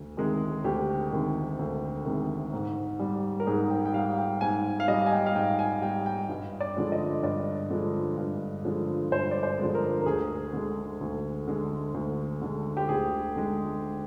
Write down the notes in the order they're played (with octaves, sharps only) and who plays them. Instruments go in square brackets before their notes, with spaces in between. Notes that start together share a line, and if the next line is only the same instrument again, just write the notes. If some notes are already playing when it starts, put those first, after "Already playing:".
Already playing: [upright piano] D2
C3 D#3 G#3
D2 G4
C3 D#3 G#3
D2
C3 D#3 G#3
G#2
G3
A#4
G#2 G#4
G5
G5
G3 F5
G5
G#2 G#5
F5
G3 D#5
G#5
G5
F5
G#2 G5
G#5
G3 G5
G5
G2
D5
D3 F3 G#3
D#5
G2 D5
D3 F3 G#3
G2
D3 F3 G#3
G2 C5
D5
C5
D3 F3 G#3
A#4
A#4
D2 G#4
D3 G#3
D2
D3 G#3
D2
D3 G#3
G4
D2 G#4
D3 G#3